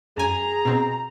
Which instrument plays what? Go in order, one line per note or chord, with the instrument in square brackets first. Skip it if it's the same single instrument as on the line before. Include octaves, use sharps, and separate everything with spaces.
[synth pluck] F#2 G#5 [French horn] G#4 [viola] A#5
[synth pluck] B2 C4